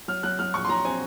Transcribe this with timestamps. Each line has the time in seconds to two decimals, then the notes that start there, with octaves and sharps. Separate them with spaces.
0.08 F#3 F6
0.23 F#3 F#6
0.39 F#3 F6
0.54 A#1 C#6
0.65 C6
0.69 F#3 A#5
0.85 C4 G#5